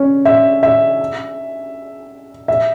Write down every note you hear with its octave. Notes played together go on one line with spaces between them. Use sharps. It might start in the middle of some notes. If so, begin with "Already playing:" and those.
Already playing: C#4
E5
E5
E5